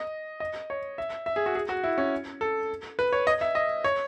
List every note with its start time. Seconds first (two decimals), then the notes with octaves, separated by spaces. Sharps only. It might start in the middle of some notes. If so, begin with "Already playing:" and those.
Already playing: D#5
0.40 D#5
0.70 C#5
0.98 E5
1.26 E5
1.36 G#4
1.46 F#4
1.55 G#4
1.69 F#4
1.84 E4
1.98 C#4
2.41 A4
2.99 B4
3.13 C#5
3.27 D#5
3.41 E5
3.55 D#5
3.84 C#5